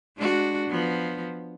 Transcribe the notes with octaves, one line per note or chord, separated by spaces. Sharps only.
G#3 D4 F#4
F3 B3